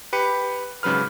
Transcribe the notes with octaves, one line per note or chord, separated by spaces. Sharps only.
G4 B4 C#7
G#2 C#3 F#3 B4 F6